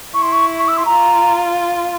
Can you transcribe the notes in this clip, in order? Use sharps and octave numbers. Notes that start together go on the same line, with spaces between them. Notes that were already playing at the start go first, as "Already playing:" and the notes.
E4 C#6
C6
C#6
C#6
E6
C6
F4 A#5